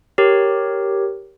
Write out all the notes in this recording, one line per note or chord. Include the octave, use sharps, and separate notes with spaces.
G4 A#4 C#5